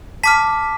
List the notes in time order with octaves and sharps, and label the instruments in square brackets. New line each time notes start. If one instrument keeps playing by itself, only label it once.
[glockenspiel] A5 D6 F6 B6